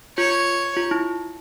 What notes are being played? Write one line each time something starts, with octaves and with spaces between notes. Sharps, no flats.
F4 C#5
F4
E4